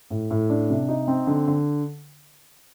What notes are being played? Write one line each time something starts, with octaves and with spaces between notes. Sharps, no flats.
A2
A2
D4
C3
D#4
C4
D3
D3